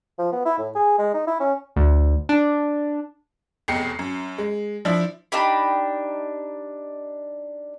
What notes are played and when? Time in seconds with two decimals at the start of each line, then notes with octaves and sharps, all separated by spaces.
0.18 F3
0.32 B3
0.45 E4
0.58 A2
0.75 G#4
0.98 G#3
1.14 D#4
1.27 E4
1.40 C#4
1.76 D2
2.29 D4
3.68 F1 B1 E2 G5 C7 C#7
3.99 F#2
4.38 G#3
4.85 F3 D4 E4
5.32 D4 D#4 G4 B5